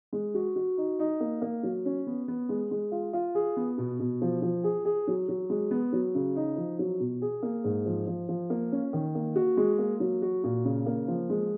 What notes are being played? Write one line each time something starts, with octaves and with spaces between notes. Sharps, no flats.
G#3
F#4
F#4
D#4
D#4
A#3
A#3
F#3
C#4
B3
B3
G#3
G#3
F4
F4
G#4
B3
B2
B2
F3
F3
G#4
G#4
F#3
F#3
G#3
B3
F#3
C#3
D#4
F3
F#3
B2
G#4
A#3
G#2
F3
F3
F3
A#3
C#4
D#3
A#3
F#4
G#3
A#3
F#3
F#4
A#2
C#3
A#3
F3
G#3